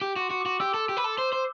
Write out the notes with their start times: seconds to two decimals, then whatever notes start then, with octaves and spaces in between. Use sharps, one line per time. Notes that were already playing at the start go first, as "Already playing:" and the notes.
0.01 G4 D6
0.16 F#4 C6
0.30 F#4
0.41 F#4 D6
0.60 G4 E6
0.74 A4
0.89 G4
0.97 B4
1.04 A4
1.18 C5
1.33 C5